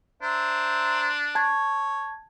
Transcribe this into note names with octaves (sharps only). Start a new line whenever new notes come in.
D4 C5 E5 A#5
C#5 A5 G#6